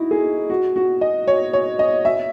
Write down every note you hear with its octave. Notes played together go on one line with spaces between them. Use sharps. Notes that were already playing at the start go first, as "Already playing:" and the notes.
Already playing: D#4 E4 F#4
G#4
F#4
F#4
D#5
C#5
C#5
D#5
E5